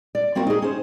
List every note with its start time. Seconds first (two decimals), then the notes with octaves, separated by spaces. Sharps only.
0.15 D5
0.35 A#3 C4 E4 F#4 A#4
0.47 D#4 G#4
0.62 C#4 C5